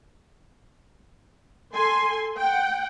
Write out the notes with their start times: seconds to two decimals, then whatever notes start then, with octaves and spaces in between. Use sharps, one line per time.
1.73 A4 G#5 C6
2.39 F#5 G5